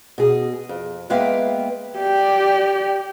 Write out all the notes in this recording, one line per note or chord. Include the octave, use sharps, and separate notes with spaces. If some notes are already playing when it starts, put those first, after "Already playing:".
B2 G#4
F2
G#3 A#3 B3 E5 F5 G5
G4 D5